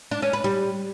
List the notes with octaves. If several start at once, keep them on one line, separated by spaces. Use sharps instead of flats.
D4
C#4
B4
G3